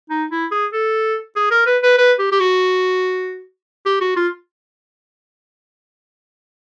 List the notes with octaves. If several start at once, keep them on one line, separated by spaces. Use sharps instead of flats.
D#4
E4
G#4
A4
G#4
A#4
B4
B4
B4
G4
G4
F#4
G4
F#4
F4